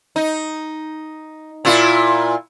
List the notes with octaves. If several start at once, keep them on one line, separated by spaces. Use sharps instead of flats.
D#4
A#2 E4 F4